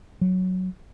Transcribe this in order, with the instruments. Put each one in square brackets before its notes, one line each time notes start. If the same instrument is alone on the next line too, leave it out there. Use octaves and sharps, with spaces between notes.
[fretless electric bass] F#3